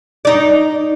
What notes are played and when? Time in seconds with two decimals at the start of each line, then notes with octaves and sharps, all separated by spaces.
0.25 D#4 D5